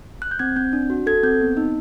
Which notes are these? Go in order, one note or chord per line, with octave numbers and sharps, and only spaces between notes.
F#6
G6
C4 G#6
C4 G6
D4
F#4
A4 G#6
C4 G6
B3
D#4